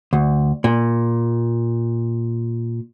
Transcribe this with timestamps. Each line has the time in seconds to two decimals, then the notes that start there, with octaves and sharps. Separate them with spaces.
0.13 D2
0.64 A#2